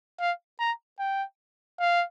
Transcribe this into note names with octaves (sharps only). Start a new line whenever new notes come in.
F5
A#5
G5
F5